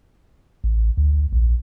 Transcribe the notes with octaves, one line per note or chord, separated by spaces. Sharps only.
A1
D2
A#1